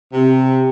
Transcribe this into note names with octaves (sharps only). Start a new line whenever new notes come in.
C3